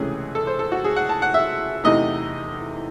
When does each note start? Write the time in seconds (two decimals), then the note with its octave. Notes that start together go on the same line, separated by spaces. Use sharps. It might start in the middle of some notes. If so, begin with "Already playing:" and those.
Already playing: C#2 C3 E3 A3 C#4 G#4
0.35 A4
0.47 C5
0.59 A4
0.72 F#4
0.85 G#4
0.96 F#5
1.09 A5
1.22 F#5
1.34 E5
1.84 E2 C3 E3 A3 D#4 D#5